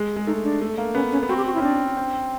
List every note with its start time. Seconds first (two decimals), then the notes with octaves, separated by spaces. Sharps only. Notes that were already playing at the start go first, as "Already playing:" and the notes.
Already playing: G#3
0.16 G#3
0.27 A3 D#4
0.44 D4
0.61 A3
0.78 A#3
0.95 B3 C#4
1.12 C#4
1.23 B3
1.29 C4 F#4
1.37 G4
1.46 F#4
1.54 E4
1.58 C#4
1.62 C4 D4
1.97 C4